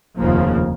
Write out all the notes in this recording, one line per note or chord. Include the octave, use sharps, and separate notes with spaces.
F1 D#2 C#3 F3 A#3